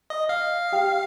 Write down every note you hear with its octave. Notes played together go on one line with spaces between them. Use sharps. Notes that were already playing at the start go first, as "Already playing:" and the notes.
D#5
F5
G4 G5